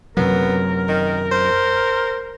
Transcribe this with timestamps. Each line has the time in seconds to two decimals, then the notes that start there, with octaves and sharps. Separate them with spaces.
0.17 F#2 C3 F#3 B3 A#4
0.89 D#3
1.32 C5